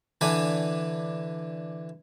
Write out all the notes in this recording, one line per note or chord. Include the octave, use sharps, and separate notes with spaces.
D3 E3 D4 B4 G#5